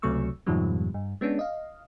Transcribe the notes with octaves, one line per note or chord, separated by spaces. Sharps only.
C#2 C3 F#3 A3 C#6 E6
F2 G#2 B2 D#3 F3 G3
G2
G#3 B3 C#4 D4
D#5 F5